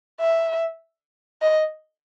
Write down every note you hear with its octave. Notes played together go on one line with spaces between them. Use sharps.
E5
D#5